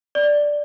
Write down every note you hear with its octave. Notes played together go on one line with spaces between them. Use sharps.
D5